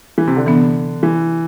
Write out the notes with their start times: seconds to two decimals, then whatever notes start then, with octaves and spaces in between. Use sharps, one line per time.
0.18 E3
0.27 C3
0.36 D3
0.46 C3 E3 B3 D4
1.03 E3